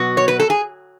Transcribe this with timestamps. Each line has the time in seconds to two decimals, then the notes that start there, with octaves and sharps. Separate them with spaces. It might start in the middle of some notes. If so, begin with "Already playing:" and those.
Already playing: B2 F#3 B3 F#4
0.17 C#5
0.28 B4
0.40 A4
0.50 G#4